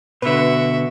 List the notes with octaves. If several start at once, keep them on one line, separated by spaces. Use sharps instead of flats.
B2 D3 F#4 B4 E5